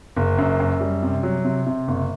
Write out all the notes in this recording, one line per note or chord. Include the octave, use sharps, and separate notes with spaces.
F#1
F#2
F#2
G3
C3
F#3
C3
C3
F#1